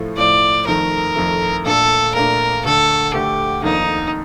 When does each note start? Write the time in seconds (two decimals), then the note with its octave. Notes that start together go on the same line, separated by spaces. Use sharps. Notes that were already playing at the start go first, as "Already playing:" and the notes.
Already playing: A2 F3 A3
0.17 A2 F3 A3 D5
0.67 F2 D#3 A3 A#4
1.16 F2 D#3 A3
1.65 A#2 A3 D4 A4
2.15 A#2 A3 D4 A#4
2.65 D2 D3 A3 A4
3.14 D2 D3 A3 G4
3.63 F2 D#3 A#3 D4 D#4